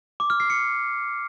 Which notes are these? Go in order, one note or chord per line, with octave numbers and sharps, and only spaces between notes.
D6
F6
C7
C#7